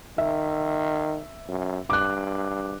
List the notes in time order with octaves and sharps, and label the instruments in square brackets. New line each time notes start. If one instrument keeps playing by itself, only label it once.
[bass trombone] D#3 [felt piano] E5
[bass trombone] F#2
[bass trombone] G2 [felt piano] D6 F#6